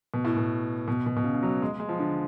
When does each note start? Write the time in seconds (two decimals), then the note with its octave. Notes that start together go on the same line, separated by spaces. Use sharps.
0.14 B2
0.25 A2
0.37 B2
0.88 B2
1.06 B2
1.17 B2
1.24 C#3
1.34 C#3
1.43 F#3
1.62 G#3
1.80 G#3
1.89 F3
1.99 D3